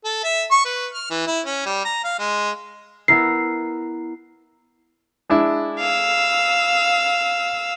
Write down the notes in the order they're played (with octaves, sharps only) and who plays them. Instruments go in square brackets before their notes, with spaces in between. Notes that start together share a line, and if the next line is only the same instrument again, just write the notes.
[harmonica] A4
E5
C#6
B4
F6
E3
E4
C#4
G3
A#5
F5
G#3
[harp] B3 E4 A#4 [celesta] C7
[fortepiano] G#3 D4 E4
[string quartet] F5 E6